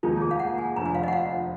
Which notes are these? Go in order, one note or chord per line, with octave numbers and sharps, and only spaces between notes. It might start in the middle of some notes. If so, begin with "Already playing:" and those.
F1 D#2 D#3 G#3 D#4 F4
G#4
F5
F#5
G#5
F1 F2 D3 A#5
G#5
F5
D#5
F#5
F5